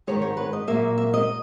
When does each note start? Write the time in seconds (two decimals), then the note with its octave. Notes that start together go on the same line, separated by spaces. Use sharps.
0.07 G#2 D#3 G#3 B3 C#5
0.22 C#5
0.37 B4
0.53 D#5
0.67 A#2 F#3 A#3 E5
0.98 E5
1.14 D#5